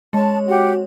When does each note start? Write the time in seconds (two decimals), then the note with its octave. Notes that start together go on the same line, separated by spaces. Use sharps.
0.13 G#3 C#4 C#5 A5
0.48 C4 F#4 G4 F#5